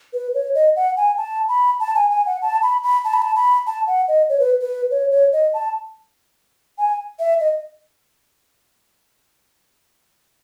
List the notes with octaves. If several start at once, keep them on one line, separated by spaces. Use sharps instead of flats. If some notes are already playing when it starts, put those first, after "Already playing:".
B4
C#5
D#5
F#5
G#5
A5
B5
A5
G#5
G#5
F#5
A5
B5
B5
A5
B5
A5
B5
A5
F#5
D#5
C#5
B4
B4
C#5
C#5
D#5
A5
G#5
E5
D#5